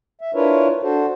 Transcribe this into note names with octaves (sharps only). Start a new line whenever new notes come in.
E5
D4 E4 F4 A#4 B4 C#5
D4 F#4 A4 C5